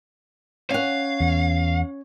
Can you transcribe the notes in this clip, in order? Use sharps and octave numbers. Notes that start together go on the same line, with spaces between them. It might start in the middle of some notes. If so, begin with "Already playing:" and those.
C#4 F5 F#5
E2